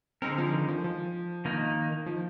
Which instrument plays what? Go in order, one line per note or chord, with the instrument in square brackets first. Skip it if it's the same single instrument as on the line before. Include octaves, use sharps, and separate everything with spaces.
[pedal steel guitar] D3 G#3 D#4 A#4 [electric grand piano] C4
[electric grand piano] F3
D#3
F3
F3
[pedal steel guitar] D#3 A#3 D#4
[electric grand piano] F3